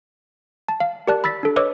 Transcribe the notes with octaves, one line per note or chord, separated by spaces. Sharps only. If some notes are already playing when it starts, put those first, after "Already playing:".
A5
F5
G4 A#4 D5 A5 F#6
B5 E6 A6 B6
D4 A4
B4 C#5 D#5 D6 E6